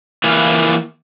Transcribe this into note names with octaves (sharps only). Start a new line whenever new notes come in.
E3 A#3 E4 F4